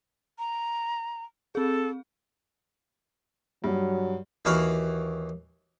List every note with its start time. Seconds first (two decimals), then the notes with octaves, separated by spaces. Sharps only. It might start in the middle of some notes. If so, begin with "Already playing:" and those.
0.38 A#5
1.55 C4 G#4 A4
3.64 G2 F#3
4.45 D#2 E3 F#4 F5 B5